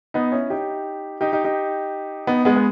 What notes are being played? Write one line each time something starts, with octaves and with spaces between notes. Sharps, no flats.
B3 D#4
C#4 E4
D#4 G4
D#4 G4
D#4 G4
D#4 G4
B3 D#4
G#3 B3
B3